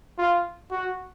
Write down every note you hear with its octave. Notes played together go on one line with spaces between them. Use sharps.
F4
F#4